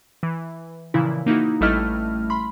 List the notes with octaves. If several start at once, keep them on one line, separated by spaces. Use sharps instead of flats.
E3
A#2 C#3 E3 F3 E4
A#3 D#4 E4 F#4
A1 G3 A3 E4 D#5 F6
B5 C6